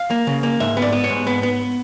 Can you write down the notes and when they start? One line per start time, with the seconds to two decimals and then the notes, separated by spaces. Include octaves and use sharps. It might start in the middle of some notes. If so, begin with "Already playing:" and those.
Already playing: F5
0.10 A#3
0.27 C#3
0.43 A#3
0.60 G#2 E5
0.77 B3
0.82 D5
0.92 B3
1.04 C#5
1.10 G#2
1.27 B3
1.43 B3